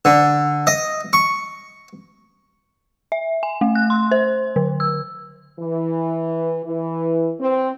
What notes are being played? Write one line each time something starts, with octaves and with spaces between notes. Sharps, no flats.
D3
D#5
C#6
E5
G#5
A3
F#6
C6
C5
D3
E6
E3
E3
C4